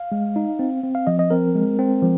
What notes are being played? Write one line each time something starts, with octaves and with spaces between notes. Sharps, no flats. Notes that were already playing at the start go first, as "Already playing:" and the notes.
Already playing: F5
G#3
D#4
C4
C4
F5
F3 D#5
D#5
C4 A#4
G#3
C4
F3